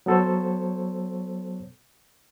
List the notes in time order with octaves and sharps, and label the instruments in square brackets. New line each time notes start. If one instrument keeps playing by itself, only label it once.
[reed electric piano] F#3 B3 A4 C5 C#5